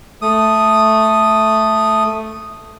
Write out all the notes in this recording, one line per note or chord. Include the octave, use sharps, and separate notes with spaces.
A3 D#6